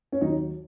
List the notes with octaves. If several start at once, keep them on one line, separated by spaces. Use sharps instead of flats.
C#4
D#2 D#3 F#3 D#4